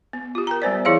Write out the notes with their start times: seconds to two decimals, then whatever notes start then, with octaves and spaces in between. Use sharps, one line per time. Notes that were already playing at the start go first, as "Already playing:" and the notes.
0.13 B3
0.35 F4 G4
0.47 A#4 G5 A#5
0.62 G3 B3 C5 D5
0.85 E3 E4 G#4 C#5 F5